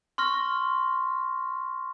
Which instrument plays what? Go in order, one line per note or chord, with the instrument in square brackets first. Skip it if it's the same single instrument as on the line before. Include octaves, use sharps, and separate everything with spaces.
[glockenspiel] C6 C#6 F6 A#6